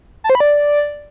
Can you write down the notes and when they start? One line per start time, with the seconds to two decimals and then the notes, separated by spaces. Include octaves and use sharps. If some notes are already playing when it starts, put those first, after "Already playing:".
0.24 A5
0.30 C5
0.35 B5
0.40 D5